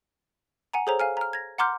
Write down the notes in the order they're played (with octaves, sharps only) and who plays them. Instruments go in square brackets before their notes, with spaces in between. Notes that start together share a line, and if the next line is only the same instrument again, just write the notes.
[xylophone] F#5 G#5 A#5
G#4 A4 C5 C#5 A#5
F5 G#5 F6
A#5 F6
G#6 A#6
F#5 A#5 C6 D6 F6 G6